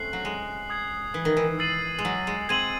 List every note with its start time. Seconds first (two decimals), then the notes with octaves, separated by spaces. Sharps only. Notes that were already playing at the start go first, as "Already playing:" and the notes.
Already playing: A3 C4 C#4 F#6 C7 F#7
0.13 F#3
0.25 G#3
0.70 D#6 G#6 C7
1.14 E3
1.25 D#3
1.37 E3
1.59 E6 A6 C7 D#7 F#7
1.99 G#3
2.05 F#3
2.27 G#3
2.49 G#3 C4 G#6 D#7 F#7